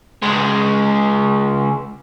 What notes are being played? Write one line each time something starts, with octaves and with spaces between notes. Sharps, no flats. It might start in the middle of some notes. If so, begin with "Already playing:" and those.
C#2 G#3